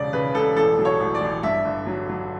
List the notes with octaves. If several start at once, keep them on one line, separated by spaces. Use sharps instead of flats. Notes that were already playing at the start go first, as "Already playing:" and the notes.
Already playing: E1 C#3 D5
C#3 B4
E1 A4
A1 A4
F#3
C#5
A1
D5
A1
G2 E5
G1
F#3
F#3